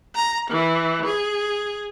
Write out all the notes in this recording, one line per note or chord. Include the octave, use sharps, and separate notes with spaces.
A#5
E3
G#4